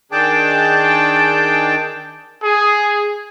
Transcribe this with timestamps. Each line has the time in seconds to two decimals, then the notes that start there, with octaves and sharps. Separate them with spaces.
0.12 D#3 D4 G#4 G5 A5 D6
2.44 G#4